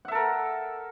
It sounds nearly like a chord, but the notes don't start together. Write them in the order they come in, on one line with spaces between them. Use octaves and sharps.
F#5 E5 A4 A#4